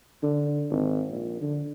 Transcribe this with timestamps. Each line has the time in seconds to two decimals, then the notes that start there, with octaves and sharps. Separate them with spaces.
0.23 D3
0.71 G#1
1.11 A#1
1.41 D3